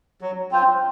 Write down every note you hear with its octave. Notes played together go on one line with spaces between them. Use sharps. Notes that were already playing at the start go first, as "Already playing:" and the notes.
F#3
C4 F4 C5